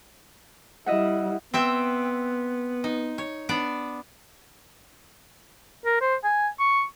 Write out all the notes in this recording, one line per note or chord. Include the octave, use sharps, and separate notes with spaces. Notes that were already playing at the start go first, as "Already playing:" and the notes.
G3 E4 D#5 E5 F#5
B3 C4 E5 G5
D#4
C#5
B3 D4 D5
A#4
C5
G#5
C#6